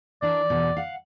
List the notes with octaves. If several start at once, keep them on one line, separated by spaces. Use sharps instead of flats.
E3 D4 A#4 D5
E2 B2
F5 F#5